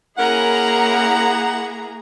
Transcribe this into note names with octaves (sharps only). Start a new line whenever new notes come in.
A#3 C#4 E4 G#4 A#4 F#5 A#5